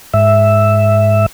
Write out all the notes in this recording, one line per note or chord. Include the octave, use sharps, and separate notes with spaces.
G#2 E5